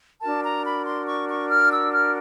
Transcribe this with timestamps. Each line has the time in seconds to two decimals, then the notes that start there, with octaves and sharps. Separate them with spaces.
0.21 D4 F#4 A#4 A5
0.44 A#5
0.64 B5
0.86 C6
1.07 C#6
1.28 C#6
1.49 F6
1.71 E6
1.92 F6